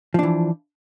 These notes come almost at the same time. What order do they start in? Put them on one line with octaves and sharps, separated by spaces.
F3 D4 E3